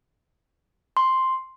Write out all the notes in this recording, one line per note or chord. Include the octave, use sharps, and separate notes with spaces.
C6